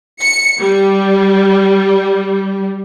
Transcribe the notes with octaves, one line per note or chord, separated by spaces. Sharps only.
C#7
G3